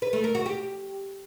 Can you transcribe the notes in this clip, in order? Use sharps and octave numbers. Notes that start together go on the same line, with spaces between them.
B4
A3
A#4
F#4
G4